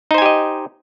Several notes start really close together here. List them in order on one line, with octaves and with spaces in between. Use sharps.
D#4 C5 G#5 G4 D#5